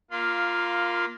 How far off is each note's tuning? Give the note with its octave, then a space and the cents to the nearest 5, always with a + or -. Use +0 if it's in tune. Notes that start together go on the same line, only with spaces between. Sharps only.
A#3 +5 F4 +0 C6 -40